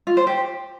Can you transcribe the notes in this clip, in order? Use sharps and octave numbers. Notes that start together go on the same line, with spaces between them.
F4
C5
G4